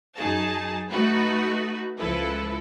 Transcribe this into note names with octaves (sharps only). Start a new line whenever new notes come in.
F#2 D#4 G#4 A5
A3 D#4 F#4 B4
C#2 F3 E4 A4 B4